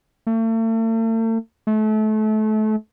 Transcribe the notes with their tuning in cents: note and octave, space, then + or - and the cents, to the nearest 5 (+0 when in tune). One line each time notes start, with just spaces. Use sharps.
A3 +40
A3 -30